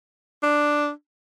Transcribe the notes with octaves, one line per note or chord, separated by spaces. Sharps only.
D4